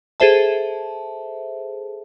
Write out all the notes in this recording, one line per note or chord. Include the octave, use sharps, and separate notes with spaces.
G#4 A4 C5 E5 A5